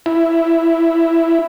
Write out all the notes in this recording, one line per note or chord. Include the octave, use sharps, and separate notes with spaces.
E4